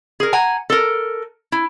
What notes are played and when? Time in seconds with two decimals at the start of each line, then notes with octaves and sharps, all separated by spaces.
0.20 G#4 A#4
0.33 F#5 G#5 A#5
0.70 A4 A#4
1.52 E4